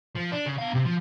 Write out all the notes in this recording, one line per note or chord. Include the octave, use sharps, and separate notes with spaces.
F3
D4
C#3
B3 F5
C3 C4
F3